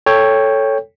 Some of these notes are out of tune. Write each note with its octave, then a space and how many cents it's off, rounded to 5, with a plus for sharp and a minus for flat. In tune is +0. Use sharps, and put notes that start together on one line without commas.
A4 +0 C#5 +0 G5 +15